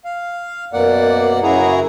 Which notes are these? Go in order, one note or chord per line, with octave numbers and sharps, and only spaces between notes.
F5
F#2 B2 A#3 D5 F#5
F#2 C#3 E4 F#4 G#4 A#5